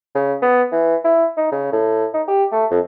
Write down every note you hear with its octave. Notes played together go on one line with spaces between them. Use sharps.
C#3
B3
E3
E4
D#4
C#3
A2
D#4
G4
A3
F2